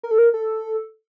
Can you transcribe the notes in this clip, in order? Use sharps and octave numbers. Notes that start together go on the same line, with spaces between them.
A#4
A4
A#4
A4